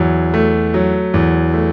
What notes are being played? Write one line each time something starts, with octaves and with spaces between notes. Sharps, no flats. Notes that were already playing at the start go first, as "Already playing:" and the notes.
Already playing: E2 F#3
A3
F#3
E2
A3